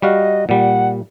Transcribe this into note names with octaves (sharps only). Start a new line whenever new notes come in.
G3 F#4 D#5 F5
A#2 G3 F#5